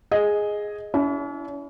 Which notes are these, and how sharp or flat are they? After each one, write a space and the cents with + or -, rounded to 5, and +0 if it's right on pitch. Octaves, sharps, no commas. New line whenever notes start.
G#4 +0 D#5 +0
C#4 +45 E4 +0